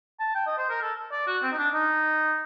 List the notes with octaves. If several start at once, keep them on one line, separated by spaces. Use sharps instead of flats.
A5
G5
D#5
C5
A#4
A4
D5
F#4
C4
D#4
D4
D#4